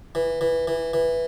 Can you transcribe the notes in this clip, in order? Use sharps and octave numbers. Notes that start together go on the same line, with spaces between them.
E3
E3
E3
E3